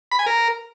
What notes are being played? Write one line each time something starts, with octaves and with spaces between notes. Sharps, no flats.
B5
G#5
A#4